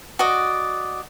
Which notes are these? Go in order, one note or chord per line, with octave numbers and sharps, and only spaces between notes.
F#4 D5 D#5